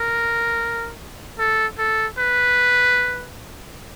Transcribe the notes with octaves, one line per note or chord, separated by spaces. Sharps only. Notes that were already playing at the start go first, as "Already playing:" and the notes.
Already playing: A#4
A4
A4
B4